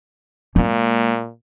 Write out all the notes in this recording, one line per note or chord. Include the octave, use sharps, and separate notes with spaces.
A#2 G#3 A#3